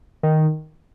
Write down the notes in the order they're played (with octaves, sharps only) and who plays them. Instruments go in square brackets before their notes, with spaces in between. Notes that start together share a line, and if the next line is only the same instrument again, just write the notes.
[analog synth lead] D#3